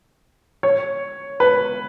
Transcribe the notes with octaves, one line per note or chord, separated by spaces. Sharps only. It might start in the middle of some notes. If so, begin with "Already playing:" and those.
C#5
B4